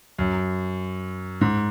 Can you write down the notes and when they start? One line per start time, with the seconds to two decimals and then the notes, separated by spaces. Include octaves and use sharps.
0.19 F#2
1.41 G#2